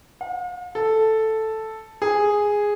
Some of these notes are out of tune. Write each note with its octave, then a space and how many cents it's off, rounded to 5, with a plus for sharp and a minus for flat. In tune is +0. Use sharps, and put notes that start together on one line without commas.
F5 +45
A4 +0
G#4 -5